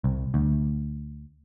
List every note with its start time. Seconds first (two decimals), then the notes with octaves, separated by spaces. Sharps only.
0.04 C2
0.34 D2